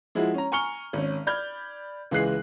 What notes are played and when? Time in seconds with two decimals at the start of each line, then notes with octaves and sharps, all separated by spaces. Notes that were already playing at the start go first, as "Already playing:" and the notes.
0.15 F3 G#3 E4 F#4
0.34 C#4 A#5
0.52 G#5 A#5 C#6 F6 C#7 G7
0.93 G#1 C#4
1.27 D5 B5 F6 G6 G#6
2.11 C#2 E3 G#3 G#4 F#6 C7